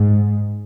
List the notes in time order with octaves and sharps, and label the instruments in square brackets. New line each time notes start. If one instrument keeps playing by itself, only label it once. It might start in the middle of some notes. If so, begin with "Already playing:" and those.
Already playing: [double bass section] G#2